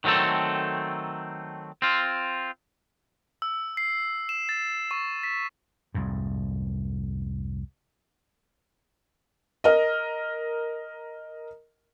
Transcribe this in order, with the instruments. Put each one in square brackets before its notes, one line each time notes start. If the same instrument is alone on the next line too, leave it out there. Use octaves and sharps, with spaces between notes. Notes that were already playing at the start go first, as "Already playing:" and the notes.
[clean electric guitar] D#3 F#3 A3 C4 A4
C4 F4
[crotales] E6
C7
E7
A6
C#6
B6
[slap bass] C2 F2 G#2
[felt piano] A#4 D#5